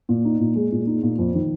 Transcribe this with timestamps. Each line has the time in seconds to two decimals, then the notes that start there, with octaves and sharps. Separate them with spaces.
0.09 A#2
0.25 D#4
0.40 A#2
0.56 G#3
0.72 A#2
0.87 D#4
1.03 A#2
1.19 F2
1.35 D#3